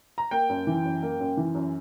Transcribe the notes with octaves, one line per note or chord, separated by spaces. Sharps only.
A#5
A#3 G5
F#2
E3
F#2
A#3
F#2
E3
F#2